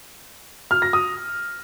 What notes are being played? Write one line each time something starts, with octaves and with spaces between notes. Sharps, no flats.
F6
A#6
D#6